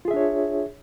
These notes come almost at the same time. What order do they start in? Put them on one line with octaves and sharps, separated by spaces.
F4 G#4 E5 D4 C#5